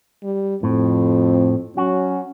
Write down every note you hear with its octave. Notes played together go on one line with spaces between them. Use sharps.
G3
F2 A2 C4
F#3 C#4 F#4